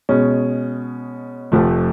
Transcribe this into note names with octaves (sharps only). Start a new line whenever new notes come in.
B2 G#3 C#4
F1 F2 F3 A3